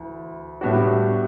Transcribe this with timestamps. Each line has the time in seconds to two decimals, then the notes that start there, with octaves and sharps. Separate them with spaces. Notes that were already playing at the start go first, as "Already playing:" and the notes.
Already playing: D2 E3
0.61 A2 G3 B3 D4 F#4